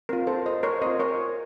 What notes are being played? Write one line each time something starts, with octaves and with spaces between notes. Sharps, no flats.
C4 F4 A#4
A4 C5
C5 D#5
A#4 C#5
C4 F4 C5 D#5
A#4 C#5